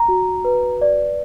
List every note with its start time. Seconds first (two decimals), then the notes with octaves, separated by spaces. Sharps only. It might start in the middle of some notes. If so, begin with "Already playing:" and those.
Already playing: A#5
0.08 F#4
0.45 B4
0.81 D5